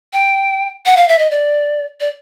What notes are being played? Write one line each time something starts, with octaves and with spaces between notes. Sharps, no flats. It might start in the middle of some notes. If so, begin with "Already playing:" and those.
G5
F#5
F5
E5
D#5
D5
D5